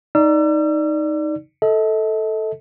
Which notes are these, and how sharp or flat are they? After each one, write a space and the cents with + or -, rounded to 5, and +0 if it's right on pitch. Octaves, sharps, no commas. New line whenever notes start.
D#4 +0 D5 +0 E6 +40
A4 +0 D#5 +40